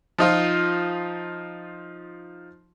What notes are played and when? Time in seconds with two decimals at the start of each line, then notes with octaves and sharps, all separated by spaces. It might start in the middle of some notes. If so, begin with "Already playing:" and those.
0.18 F3 D#4 F4